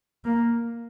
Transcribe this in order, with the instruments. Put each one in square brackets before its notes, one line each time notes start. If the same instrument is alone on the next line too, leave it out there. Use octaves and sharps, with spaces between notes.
[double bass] A#3